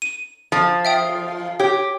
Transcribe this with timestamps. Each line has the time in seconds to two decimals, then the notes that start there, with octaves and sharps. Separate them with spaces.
0.02 D#7
0.52 F3
0.85 E5 G5 D#6
1.60 G4 C#5